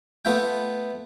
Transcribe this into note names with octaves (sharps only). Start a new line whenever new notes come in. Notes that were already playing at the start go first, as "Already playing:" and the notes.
A3 B3 F4 E5 G5